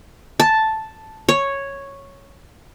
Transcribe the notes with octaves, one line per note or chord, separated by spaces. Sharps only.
A5
C#5